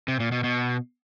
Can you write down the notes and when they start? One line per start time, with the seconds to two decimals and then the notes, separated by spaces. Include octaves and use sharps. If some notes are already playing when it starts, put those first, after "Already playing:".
0.08 C3
0.20 A#2
0.32 B2
0.44 B2